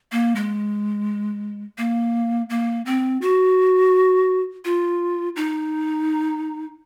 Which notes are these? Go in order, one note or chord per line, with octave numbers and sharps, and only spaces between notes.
A#3
G#3
A#3
A#3
C4
F#4
F4
D#4